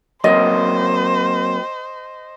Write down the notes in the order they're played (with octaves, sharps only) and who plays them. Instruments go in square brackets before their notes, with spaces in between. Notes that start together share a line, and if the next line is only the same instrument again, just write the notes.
[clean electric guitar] F#3 A#3 C4 [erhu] C5 [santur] D#5